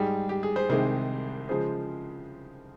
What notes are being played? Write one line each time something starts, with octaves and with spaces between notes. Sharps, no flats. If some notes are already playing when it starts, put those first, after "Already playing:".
Already playing: G#2 G3 G#4
G4
G#4
G#4 C5
C2 C3 D#3 G#3 G#4 C5
C#3 F3 G#3 G#4 C5